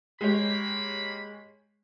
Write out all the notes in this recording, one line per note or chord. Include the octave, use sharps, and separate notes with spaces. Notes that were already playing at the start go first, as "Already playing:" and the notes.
G#3 A#3 G4 C#5 B5